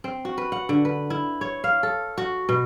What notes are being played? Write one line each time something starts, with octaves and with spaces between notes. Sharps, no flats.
C4
F#4
B4
F#5
D3
B4
E4
C#5
F5
A4
F#4
B2